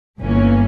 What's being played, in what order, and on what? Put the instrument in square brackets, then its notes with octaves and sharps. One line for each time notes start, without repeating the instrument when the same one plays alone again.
[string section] G1 G2 E3 A#3 C#4